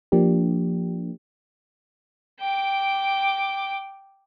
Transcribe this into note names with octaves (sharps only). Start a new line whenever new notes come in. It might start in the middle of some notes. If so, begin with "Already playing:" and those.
F3 A#3 D4 G4
G5 D6